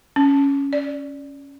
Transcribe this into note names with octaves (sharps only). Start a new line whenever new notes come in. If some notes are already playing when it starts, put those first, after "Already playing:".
C#4
D5